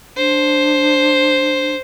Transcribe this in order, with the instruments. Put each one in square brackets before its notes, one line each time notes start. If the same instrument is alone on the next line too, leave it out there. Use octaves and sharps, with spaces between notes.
[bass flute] D4 [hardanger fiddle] C5